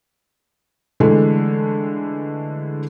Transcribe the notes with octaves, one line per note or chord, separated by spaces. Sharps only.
D3 E3 G#3 A3